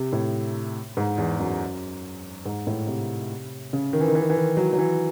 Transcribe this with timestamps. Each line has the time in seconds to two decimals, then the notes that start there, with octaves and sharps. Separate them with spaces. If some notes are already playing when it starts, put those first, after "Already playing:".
Already playing: C3
0.13 A2
0.97 G#2
1.18 E2
1.39 F#2
2.45 G#2
2.67 A2
2.87 C3
3.73 C#3
3.93 D#3
4.00 E3
4.08 D#3
4.15 E3
4.22 D#3
4.30 E3
4.37 D#3
4.57 F#3
4.73 F#3
4.78 E3